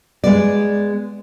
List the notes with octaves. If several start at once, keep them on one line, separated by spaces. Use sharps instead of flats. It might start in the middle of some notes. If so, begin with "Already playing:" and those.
G#3 B3 D5